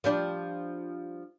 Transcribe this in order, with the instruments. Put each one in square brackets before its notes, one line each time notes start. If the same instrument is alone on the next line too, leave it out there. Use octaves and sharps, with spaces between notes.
[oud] F3 G3 D4